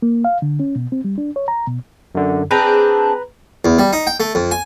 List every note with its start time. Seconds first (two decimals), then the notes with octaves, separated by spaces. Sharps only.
0.02 A#3
0.25 F5
0.42 D3
0.60 C#4
0.76 B2
0.92 C4
1.04 G3
1.18 D4
1.36 C#5
1.48 A#5
1.67 B2
2.15 F#2 D3
2.51 C4 D4 G#4 B4 A#5
3.65 E2
3.79 G3
3.93 D#4
4.07 G5
4.20 A3
4.35 F2
4.51 G#5